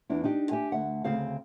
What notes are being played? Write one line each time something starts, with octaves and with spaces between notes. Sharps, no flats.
E2 D4 E4
D4 D#4 G4
G4 E5 G#5
D2 E5 F#5
D2 C#3 C4 G#4 C5 F5